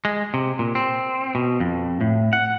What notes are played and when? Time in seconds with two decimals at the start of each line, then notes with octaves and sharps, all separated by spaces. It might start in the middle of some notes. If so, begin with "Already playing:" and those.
0.05 G#3
0.34 C3
0.59 A#2
0.75 C4
1.35 B2
1.60 F2
2.01 A2
2.33 F#5